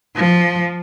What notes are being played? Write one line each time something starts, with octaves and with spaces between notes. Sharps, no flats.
F3